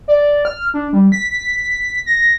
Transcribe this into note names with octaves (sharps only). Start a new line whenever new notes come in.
D5
F6
D4
G3
B6
A#6